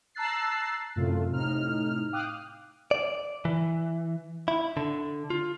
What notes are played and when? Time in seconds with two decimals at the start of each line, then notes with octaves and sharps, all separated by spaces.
0.15 A5 A#5 E6 F#6 A6 C7
0.96 F#2 A2 C3 A3 F4
1.31 A2 C3 D#4 F6
2.12 F5 G5 D6 D#6 F6 F#6
2.91 D5
3.45 E3
4.48 E4
4.77 D3
5.30 F4